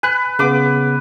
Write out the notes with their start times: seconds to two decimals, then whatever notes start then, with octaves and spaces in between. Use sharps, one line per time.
0.03 B4 G#5 F#6
0.39 C#3 B3 B4 D6